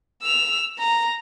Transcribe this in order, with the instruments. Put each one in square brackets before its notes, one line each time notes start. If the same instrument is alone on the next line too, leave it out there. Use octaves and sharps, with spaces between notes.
[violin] E6 F7
A#5